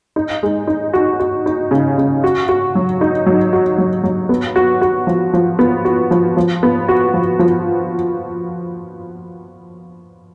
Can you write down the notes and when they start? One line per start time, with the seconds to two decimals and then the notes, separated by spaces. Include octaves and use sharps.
0.16 D#4
0.43 G#3
0.67 D#4
0.93 F#4
1.19 F#4
1.46 D#4
1.71 C#3
1.98 C#3
2.24 F#4
2.49 F#4
2.75 F#3
3.01 D#4
3.26 F#3
3.53 F#4
3.78 F#3
4.03 F#3
4.29 B3
4.56 F#4
4.81 F#4
5.07 F3
5.33 F3
5.59 B3
5.85 F#4
6.11 F3
6.37 F3
6.63 B3
6.88 F#4
7.14 F3
7.39 F3